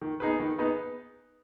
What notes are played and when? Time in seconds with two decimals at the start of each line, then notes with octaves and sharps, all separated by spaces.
0.02 D#3
0.20 B3 D#4 G#4 B4
0.40 D#3
0.59 B3 D#4 G#4 B4